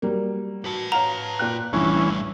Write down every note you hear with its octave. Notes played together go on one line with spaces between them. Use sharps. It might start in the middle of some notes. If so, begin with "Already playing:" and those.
F#3 G3 A#3
F#4 B4 A5
C#5 F5 F#5 A#5
A#2 G5 F#6
A#1 A2 E3 G3 C#4